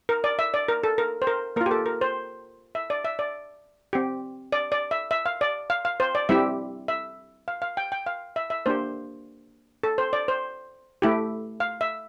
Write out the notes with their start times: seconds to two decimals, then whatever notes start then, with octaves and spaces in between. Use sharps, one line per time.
0.09 A#4
0.24 D5
0.39 E5
0.54 D5
0.68 A#4
0.84 A4
0.98 A#4
1.22 C5
1.27 A#4
1.56 A#3 F4 A#4
1.66 G4
1.71 A4
1.86 A#4
2.01 C5
2.75 E5
2.90 D5
3.05 E5
3.19 D5
3.93 C4 G4
4.52 D5
4.72 D5
4.91 E5
5.11 E5
5.26 F5
5.41 D5
5.70 F5
5.85 F5
6.00 C5
6.15 D5
6.29 G3 C4 E4 G4 E5
6.88 E5
7.48 F5
7.62 F5
7.77 G5
7.92 G5
8.06 F5
8.36 E5
8.50 E5
8.66 A#3 D4 G4 C5
9.83 A4
9.98 C5
10.13 D5
10.28 C5
11.02 A3 E4 G4
11.60 F5
11.81 E5